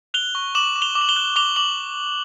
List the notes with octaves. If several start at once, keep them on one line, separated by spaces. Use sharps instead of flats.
F#6 F7 G7
C#6
D6 E7 F#7
D6
F7 G7
D6
F#7
F7 G7
F#6
D6 F7 G7
D6 F#7